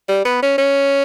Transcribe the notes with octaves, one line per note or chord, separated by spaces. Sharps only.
G3
B3
C#4
C#4